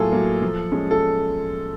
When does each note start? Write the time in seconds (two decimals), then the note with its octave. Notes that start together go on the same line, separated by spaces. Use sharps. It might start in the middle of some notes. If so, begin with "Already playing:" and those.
Already playing: A2 F#3 A#3 F4 G#4 A4
0.12 F#3 A#3
0.42 F3
0.72 G#3 C#4
0.91 A4